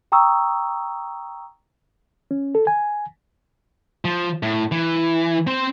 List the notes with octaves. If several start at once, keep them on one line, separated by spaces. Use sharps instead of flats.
G5 A#5 C#6 D#6 E6
C#4
A4
G#5
F3
A2
E3
C4 C5